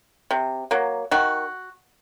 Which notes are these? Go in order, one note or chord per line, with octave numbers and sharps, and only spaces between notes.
C3
F#3 A#3
D#3 F#4